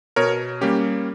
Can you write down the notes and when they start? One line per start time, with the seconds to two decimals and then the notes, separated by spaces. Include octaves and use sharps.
0.16 B2 A#4 C#5
0.61 G3 A#3 C#4 G4